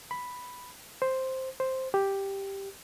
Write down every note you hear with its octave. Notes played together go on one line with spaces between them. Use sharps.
B5
C5
C5
G4